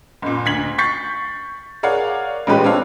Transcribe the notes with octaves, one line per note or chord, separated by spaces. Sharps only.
F#1 A#2
D2 G#6 B6 F#7
C#6 G6 A6 B6 C7
G#4 A#4 C#5 D5 F5 F#5
A1 A#2 G#3 C#4 G4 B4
C4 D4 A4 C#5 F5